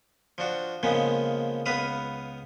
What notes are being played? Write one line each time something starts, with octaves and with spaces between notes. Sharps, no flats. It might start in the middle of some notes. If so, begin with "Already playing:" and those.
F3 D4 F#4
C#3 F3 G#3 A#3 B3
C#2 B3 B4 F5 D#6